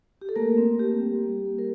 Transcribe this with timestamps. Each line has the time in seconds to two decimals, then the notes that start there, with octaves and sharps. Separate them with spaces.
0.22 G4
0.29 A4
0.36 A3 A#3 A#4
0.57 C4
0.79 A#3 G4
1.01 G3
1.23 A#3
1.45 A#3
1.59 A#4